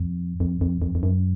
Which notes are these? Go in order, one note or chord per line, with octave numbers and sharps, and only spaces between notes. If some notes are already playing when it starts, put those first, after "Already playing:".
Already playing: F2
F2
F2
F2
F2
F#2